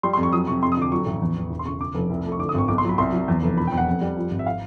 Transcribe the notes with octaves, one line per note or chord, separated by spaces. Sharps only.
G3 C6
F2 C6
C#6
F#3 D#6
C3 C#6
F2 C6
D#6
D3 D6
F#3 C#6
A1
E2
E2
E1
C6
C#3 C#6
C#3 D6
F1
C2
A3
C#6
D3 D6
D#6
G#1 C#6
B1 D6
C6
F#3 B5
C2 C6
F#3
E2
F1
E1 B5
E2 G5
F#5
F2
G3
F3
G#1
E5
F5